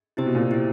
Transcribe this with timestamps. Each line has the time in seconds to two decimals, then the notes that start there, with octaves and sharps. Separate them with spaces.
0.17 C3 E4 G4 C5
0.26 B2
0.35 A#2
0.42 B2
0.51 E4 G4 C5